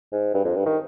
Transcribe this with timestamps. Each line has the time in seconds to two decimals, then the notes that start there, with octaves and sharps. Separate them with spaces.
0.12 G#2
0.34 G2
0.45 F2
0.56 G2
0.66 D#3